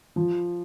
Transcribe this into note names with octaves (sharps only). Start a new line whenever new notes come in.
F3